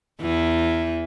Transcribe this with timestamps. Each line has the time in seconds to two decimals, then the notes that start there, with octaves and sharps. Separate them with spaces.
0.21 E2 E3